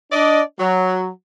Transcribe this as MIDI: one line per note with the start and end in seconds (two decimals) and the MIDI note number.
0.12 0.41 62
0.12 0.41 74
0.12 0.41 75
0.59 1.09 54